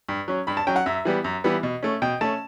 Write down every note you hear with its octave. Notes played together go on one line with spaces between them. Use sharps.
G2
F#3 C#4
G2 B5
A5
F#3 C#4 G5
F#5
F#2 E5
E3 G3 B3
F#2
E3 G3 B3
B2
A3 C#4
B2 G5
A3 C#4 A5